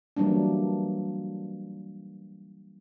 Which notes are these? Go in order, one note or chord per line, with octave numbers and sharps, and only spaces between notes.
E3 F#3 G3 A#3 D4